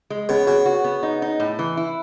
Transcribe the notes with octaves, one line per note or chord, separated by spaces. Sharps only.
G#3
C#3 B3
C#3 F#4
F#4
B3
D#4
D#4
A2
E3
E4